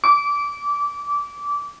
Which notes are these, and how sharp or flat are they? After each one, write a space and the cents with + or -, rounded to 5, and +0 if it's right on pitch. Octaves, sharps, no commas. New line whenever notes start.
D6 -20